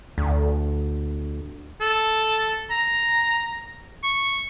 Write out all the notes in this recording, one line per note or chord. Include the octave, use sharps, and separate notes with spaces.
D2
A4
A#5
C#6